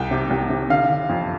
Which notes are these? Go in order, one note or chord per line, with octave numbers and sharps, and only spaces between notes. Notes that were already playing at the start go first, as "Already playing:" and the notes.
Already playing: C2 G5
C3
C2
C3
D3 F5
D3
F2